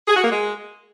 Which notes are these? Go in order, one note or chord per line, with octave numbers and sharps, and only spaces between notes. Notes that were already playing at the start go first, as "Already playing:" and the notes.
G#4
F#4
A#3
G#3